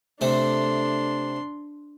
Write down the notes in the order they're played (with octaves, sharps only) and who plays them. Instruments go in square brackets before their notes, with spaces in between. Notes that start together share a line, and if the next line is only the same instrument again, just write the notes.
[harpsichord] C3 A3 [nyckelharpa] D4 C6